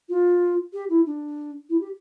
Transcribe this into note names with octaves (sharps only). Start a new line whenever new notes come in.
F4
G4
E4
D4
E4
G4